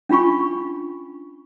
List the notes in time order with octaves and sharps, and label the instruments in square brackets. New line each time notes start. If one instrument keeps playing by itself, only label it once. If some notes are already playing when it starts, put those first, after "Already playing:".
[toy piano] C#4 D4 F4 B5 C#6